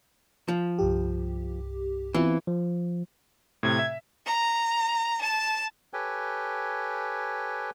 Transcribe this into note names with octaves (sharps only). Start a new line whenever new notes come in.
F3
C2 G2 G4
E3 B3 C4 F4
F3
A2 C3 G#6
E5
A#5
A5
G4 A4 B4 C#5 G5 G#5